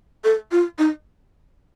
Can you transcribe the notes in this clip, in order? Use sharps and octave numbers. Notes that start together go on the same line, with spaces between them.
A4
F4
D#4